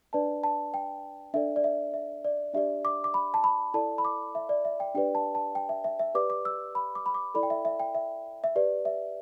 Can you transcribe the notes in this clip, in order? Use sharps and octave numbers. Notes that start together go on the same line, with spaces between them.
D4 B4 D5 A5
A5
G5
D4 A4 D5 E5
D5
E5
E5
D5
D4 G4 D5 E5
D6
D6
B5
A5
B5
E4 A4 D5 A5
B5
D6
E5
D5
E5
G5
D4 G4 B4 D5 G5
A5
A5
G5
E5
E5
E5
G4 B4 D5 D6
D6
E6
B5
D6
B5
D6
E4 A4 D5 B5
G5
E5
E5
G5
E5
E5
G4 B4 D5
E5